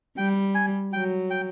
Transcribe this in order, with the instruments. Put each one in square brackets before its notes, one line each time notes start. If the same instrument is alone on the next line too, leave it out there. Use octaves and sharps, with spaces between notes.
[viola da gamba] G3 [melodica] G5
[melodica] G#5
[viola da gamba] F#3 [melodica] G5
[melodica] G5